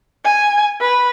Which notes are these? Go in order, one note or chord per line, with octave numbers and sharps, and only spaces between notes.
G#5
B4